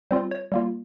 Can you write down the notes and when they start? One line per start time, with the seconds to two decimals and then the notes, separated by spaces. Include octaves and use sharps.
0.11 G3 C4 F4 C5
0.31 C#5
0.52 G3 A#3 F4